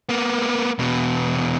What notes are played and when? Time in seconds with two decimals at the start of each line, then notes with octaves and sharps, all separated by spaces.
0.09 A#3 B3
0.79 E2 B2